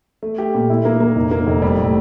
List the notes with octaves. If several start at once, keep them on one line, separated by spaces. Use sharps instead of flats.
A3
G4
A#2
E4
A#3
A#3
F1
A#3
F1
G3
A2